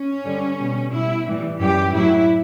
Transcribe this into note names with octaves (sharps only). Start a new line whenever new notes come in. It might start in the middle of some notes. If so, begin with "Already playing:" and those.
Already playing: C#4
G2 D3 G3
B2 G3
B2 G3 E4
A2 E3 G3
F#2 E3 G3 G4
A2 F#3 E4